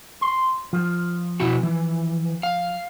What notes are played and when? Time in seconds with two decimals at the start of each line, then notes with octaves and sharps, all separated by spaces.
0.21 C6
0.73 F3 F4
1.40 B2 E4 F#4
1.63 E3
2.43 F5